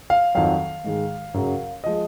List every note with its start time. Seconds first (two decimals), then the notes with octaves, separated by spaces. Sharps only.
0.10 F5
0.35 F2 D#3 F#3 F5
0.84 G#2 D#3 G#3
1.34 F#2 C#3 F#3
1.84 F3 G#3 D#5